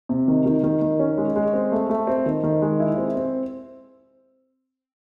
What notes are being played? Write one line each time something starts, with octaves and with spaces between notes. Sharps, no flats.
C3
D#3
D#3
D#3
D#3
C#4
G#3
G#3
C4
A3
A3
C4
D#3
D#3
G#3
E4
C4
C4